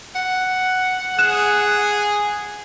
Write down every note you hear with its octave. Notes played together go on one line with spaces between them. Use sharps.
F#5
G#4 F#6 E7